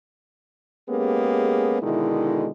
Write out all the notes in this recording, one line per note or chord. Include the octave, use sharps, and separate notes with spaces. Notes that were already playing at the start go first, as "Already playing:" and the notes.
G#3 A#3 B3 C#4 G4 G#4
B2 D3 D#3 G#3 E4